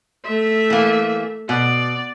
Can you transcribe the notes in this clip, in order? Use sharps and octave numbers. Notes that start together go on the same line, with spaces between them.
A3 E5
E3 A#3
B2 D5